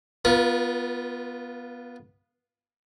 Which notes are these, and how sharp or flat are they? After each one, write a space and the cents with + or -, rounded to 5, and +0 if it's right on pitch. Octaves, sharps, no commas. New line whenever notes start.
B3 -5 F4 +0 A#4 +45